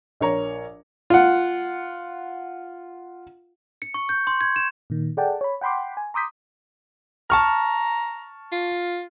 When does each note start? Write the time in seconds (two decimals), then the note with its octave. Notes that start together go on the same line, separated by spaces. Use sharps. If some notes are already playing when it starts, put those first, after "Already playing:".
0.20 A#1 A#4 C#5 A#5
1.10 F4 F#5
3.82 C#7
3.94 C#6
4.09 G6
4.27 C6
4.41 G#6
4.56 E7
4.90 A#2 D#3
5.17 G#4 A4 D5 F#5 G5 A5
5.41 C#5 B5
5.61 F#5 G5 B5 C6 D6
5.97 G#5
6.14 A#5 C6 D6 D#6 G6 B6
7.30 A5 A#5 C#6 F6
8.52 F4